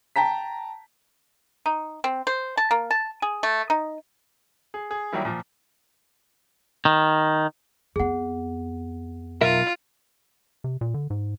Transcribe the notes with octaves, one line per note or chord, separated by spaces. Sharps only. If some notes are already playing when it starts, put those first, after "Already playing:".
G5 A5 A#5 B6
D#4
C4
C5
A5
A#3
A5
G#4
A3
D#4
G#4
G#4
D#3 F#3 G3 A#3 E4
A#2 F3
D#3
F2 B3 G#4 F#5
B1 F4 A#4 E5
C3
A#2
D3
G#2